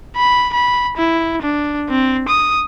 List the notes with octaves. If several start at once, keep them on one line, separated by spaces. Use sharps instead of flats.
B5
B5
E4
D4
C4
D#6